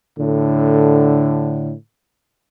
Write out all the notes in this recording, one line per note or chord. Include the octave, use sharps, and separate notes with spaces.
A2 D3